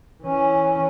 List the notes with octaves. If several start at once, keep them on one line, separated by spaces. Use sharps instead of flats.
E3 C#4